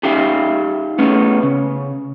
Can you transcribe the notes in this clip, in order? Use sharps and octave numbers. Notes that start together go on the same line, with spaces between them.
C#4 D#4 G4 E5 F5 G5
A3 B3 C#4 G#4
C#3